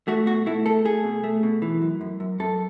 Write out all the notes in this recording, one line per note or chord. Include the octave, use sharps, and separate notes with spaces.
A3 F#4
B2 F#4
A3 E4
A3 A4
A3 G#4
B2
A3
B2
E3
F#2
F#2
F#2
F#2 A4